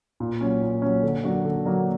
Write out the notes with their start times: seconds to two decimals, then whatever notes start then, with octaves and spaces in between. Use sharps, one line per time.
0.20 A#2
0.41 F#3 C#4
0.61 A#2
0.82 F#3 C#4
1.03 D3
1.24 F#3 A#3 D4 F#4
1.45 D3
1.65 F#3 A#3 D4 F#4